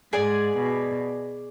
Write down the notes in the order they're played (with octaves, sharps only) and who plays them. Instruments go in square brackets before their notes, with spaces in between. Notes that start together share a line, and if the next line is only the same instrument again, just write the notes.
[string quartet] G#2 [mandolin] G#4 D5 G#5
[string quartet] B2